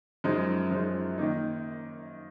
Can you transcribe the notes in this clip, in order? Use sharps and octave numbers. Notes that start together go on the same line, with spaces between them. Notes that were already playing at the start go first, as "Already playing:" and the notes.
F#2 F3 G#3 D#4
F#2 F3 G#3 D#4
D#3 A#3 D#4